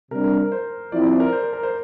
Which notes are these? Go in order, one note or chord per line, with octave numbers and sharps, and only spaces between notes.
C3 G3 D4 A#4
A#4
A#4
C5
F3 C4 E4 D5
D5
A#4
C5
A#4
A#4
C5